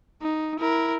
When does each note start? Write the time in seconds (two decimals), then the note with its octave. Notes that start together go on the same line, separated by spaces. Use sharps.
0.22 D#4
0.60 E4 A#4